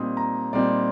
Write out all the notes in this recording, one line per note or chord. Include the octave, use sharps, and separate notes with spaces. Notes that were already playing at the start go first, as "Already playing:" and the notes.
Already playing: A#2 G3 C4 D#4 D#6
A#5
A#2 G3 C4 D#4 D5